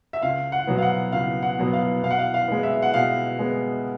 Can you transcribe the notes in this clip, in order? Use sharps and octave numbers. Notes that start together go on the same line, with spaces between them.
E5
C#2 F5
F#5
B2 F#3 B3
F5
F#5
C#2 F5
F#5
B2 F#3 B3
F5
B2 F5
F#5
F5
F5
G#3 B3
E5
F#5
B2 F5
G#3 B3